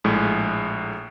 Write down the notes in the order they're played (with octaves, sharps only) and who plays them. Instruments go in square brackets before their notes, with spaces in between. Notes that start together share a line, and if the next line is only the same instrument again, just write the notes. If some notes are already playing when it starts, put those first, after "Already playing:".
[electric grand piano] A#1 A2 G#3